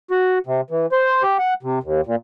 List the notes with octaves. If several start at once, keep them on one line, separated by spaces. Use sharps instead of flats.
F#4
C3
E3
C5
G4
F#5
C3
D#2
A#2